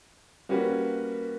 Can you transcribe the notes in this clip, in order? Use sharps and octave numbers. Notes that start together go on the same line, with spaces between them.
G3 A#3 C#4 F#4 B4